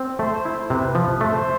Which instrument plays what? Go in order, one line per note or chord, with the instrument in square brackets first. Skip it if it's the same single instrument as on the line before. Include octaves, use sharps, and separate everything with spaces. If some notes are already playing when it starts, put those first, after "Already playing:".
Already playing: [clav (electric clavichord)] C4
[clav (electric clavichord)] A3 [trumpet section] C5
[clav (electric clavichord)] E4
[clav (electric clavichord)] C3 [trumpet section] B4
[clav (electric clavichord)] F3
[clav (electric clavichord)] A3 [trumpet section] C5